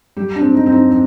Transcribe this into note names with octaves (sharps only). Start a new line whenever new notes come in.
G3 G4
D4
C4
D#4
C4
D#4
C4